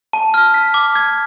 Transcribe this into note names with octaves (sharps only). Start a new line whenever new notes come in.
A5
F6
B6
D6
G#6